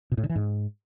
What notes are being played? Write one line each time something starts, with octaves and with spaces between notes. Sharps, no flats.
B2
A2
D3
E3
G#2